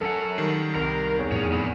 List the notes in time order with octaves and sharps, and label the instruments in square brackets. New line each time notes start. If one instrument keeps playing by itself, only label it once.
[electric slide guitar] F#2 C#4 F#5 [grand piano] A4
[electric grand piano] D#3 G3 [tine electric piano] C7
[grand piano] C2 [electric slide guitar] A#4
[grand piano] E2 [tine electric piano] C#5
[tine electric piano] F2 A2 [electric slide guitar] G#4 C#5
[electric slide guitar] B3 E4 G#4